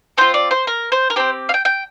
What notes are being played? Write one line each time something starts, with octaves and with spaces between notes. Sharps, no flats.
C4 F4 C5
D5
C5
A#4
C5
A#4
C4 G4 C5
F5
G5
G5